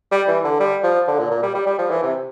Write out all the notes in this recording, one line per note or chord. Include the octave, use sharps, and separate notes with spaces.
G3
E3
D3
G3
F3
D3
A#2
A#2
G3
G3
G3
F3
E3
C3